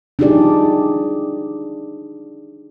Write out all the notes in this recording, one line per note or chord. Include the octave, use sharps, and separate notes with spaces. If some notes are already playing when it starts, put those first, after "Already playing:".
D4 D#4 F4 G4 G#4 D5